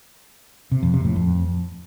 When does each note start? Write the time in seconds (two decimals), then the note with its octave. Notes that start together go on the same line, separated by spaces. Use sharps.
0.72 C3
0.83 F2
0.94 C3
1.05 A2
1.16 F2